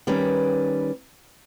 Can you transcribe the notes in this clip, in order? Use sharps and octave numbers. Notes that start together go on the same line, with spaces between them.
D#3 G3 C#4 B4